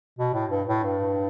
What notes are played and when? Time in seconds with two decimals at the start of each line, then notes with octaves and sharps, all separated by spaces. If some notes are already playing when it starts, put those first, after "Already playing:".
0.19 B2
0.34 A2
0.51 G2
0.68 A2
0.84 G2